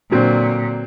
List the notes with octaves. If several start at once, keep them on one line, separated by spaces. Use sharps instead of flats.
A#2 D3 F#3 C4